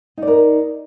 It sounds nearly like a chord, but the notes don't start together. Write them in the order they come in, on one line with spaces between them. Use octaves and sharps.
D#4 D5 A#4